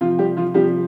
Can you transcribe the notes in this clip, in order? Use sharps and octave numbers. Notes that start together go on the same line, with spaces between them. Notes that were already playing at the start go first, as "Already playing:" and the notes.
C3 F3 F4
G3 G4
F3 F4
C3 F3 G3 G4